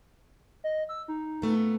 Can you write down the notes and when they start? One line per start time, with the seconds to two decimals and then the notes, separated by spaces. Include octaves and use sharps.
0.64 D#5
0.89 E6
1.08 D#4
1.42 A#2 A3 B3